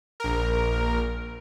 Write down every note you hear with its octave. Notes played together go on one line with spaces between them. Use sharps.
A#1 A#4